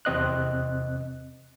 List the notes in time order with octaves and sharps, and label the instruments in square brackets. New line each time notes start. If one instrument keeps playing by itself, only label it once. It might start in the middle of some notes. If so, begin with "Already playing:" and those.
[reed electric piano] E2 C3 C4 D#5 F#6